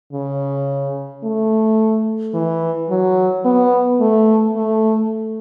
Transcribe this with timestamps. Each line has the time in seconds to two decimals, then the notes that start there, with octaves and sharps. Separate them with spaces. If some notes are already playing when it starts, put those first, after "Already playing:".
0.13 C#3
1.23 A3
2.34 E3
2.90 F#3
3.45 B3
4.00 A3
4.56 A3